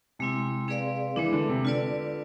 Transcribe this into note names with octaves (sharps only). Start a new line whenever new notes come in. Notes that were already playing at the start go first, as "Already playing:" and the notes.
C3 G#3 C4 E4
C4 G#4 B4 D5 F5
E3 G#3 B3 D4
D3
C3
D3 F4 B4 D5